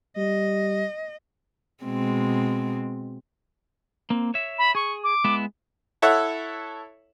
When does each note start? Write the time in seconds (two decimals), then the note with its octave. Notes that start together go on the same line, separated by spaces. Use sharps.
0.17 G3 D#5
1.84 B2 G#3 C4
4.10 A#3 C4
4.34 C#5 E5
4.58 B5
4.75 G#4 C#6
5.03 D6
5.24 G#3 B3 E4
6.02 E4 A4 C#5 E5 F#5